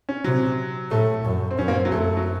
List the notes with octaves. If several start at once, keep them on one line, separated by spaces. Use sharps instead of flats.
C#4
C3 F#3
A2 A3
F#2
C4
F#2 C#4
A#3
C4
F#3
F#2 A3
F#3